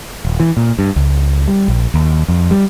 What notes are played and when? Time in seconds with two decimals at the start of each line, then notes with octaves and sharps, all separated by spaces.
0.25 D#1
0.40 E3
0.57 A#2
0.79 G2
0.96 C#2
1.48 G3
1.68 A#1
1.94 D#2
2.28 F2
2.51 G3